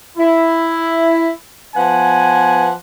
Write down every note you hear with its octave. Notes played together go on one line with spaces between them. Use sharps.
E4
F3 B3 B4 F#5 G#5